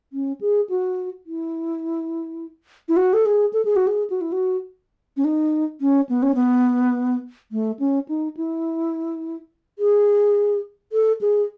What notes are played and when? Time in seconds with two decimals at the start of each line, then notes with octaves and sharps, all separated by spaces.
0.13 C#4
0.41 G#4
0.70 F#4
1.26 E4
2.89 E4
2.97 F#4
3.13 A4
3.26 G#4
3.53 A4
3.65 G#4
3.76 F#4
3.87 G#4
4.10 F#4
4.21 E4
4.32 F#4
5.17 C#4
5.25 D#4
5.81 C#4
6.09 B3
6.23 C#4
6.35 B3
7.52 A3
7.79 C#4
8.09 D#4
8.37 E4
9.79 G#4
10.92 A4
11.21 G#4